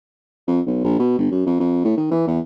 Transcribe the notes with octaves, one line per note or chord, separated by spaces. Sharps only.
F2
B1
A#1
B2
G1
F#2
F2
F2
A2
D#3
E3
E2